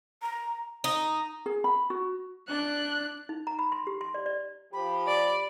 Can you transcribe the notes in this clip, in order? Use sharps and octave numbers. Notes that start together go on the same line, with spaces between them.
A#5
D#4
G#4
B5
F#4
D4 F#6
D#4
A#5
B5
C6
G4
C6
D5
D5
F3 G4 B5
D5